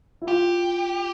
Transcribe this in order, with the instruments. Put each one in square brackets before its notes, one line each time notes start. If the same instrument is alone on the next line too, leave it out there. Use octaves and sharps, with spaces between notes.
[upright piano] E4
[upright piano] F4 [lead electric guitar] G4